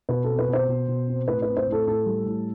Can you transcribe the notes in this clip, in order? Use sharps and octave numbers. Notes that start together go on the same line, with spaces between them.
B2 B4
C4 A4
B4
B2
C5
B2
B2
C4
A2 B4
B4
C4
C5
A2
A4
A2 A4
G3
A2